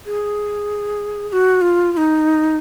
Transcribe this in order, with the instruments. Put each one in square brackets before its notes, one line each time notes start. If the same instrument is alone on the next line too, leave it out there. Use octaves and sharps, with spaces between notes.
[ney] G#4
G#4
F#4
F4
F4
D#4